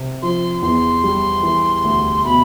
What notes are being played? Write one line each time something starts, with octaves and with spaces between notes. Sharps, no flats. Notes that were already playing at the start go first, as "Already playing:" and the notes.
Already playing: C3
F3 C6
E2 C6
G3
E3
D2
B2 B5